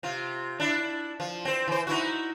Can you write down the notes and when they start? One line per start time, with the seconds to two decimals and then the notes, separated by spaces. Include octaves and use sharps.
0.03 C3 F4
0.60 D4 E4
1.20 F3
1.45 C4 C5
1.68 E3 C5
1.87 D#4 E4 F#4